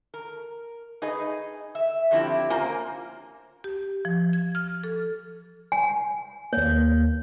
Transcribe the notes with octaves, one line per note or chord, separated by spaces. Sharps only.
A#4
D#4 G#4 B4 D#5
E5
D3 F3 C4 E4 G4
A#3 C#4 F4 C5 G#5 A#5
G4
F3
G#6
F6
A4
G#5
D#2 A#3 C#5